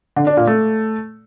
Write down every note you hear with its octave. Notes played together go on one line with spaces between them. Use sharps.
D3
D4
A#2
A3